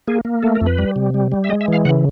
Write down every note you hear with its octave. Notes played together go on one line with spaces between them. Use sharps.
A#3 G#4
A#3
A3 A4
A#4
F2
B4
G3
C3
G3
G3
E5
G#3 D#5
E5
E3 F5
C#3 F#5